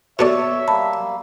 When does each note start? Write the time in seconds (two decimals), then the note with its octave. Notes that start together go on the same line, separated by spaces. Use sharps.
0.19 B2 A4 C#5 D5 E5
0.68 G3 A#3 A5 B5